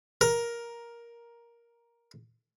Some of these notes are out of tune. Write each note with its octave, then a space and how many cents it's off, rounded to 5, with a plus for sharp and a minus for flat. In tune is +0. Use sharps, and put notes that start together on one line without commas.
A#4 +10